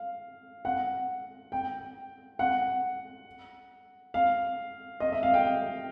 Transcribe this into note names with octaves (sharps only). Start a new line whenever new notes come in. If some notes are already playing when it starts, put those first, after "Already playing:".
Already playing: F5
F#5
G5
F#5
F5
D#5
E5
F5
G5